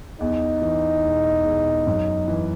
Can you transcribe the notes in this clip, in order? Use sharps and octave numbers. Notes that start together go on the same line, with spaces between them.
E2 D#4
E3
E1
E1
F#2
E3